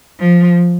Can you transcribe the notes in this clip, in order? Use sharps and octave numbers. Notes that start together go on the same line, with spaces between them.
F3